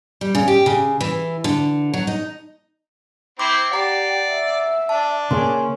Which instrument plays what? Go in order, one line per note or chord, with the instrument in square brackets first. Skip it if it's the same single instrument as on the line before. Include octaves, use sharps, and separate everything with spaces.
[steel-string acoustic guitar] G3
C#3
G4
C#3
E3
D3
F#3
D#4
[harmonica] C4 E4 C5 [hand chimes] D6
[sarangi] G4 [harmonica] D5 [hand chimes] F#5 A#5 C7
[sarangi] E5
[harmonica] D4 [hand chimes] A5
[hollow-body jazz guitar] C#3 A#3 G#4 [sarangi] C#4 [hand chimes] C6